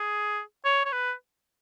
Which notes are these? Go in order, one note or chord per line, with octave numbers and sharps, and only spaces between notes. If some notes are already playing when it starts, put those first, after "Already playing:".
Already playing: G#4
C#5
C#5
B4